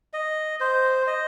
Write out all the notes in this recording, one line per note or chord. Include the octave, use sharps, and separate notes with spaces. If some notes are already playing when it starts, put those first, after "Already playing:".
D#5
C5
D#5